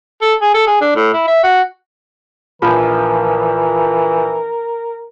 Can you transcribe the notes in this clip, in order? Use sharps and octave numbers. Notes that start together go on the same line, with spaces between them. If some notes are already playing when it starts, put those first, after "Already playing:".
A4
G#4
A4
G#4
D4
A2
E4
E5
F#4
A#1 E3 F3 A#4 B5